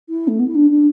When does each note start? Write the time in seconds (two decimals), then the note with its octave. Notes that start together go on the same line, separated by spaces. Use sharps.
0.09 E4
0.28 A3
0.39 B3
0.48 E4
0.55 D4
0.70 D4